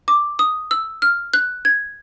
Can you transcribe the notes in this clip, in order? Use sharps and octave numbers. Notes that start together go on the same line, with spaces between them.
D6
D#6
E6
F6
F#6
G#6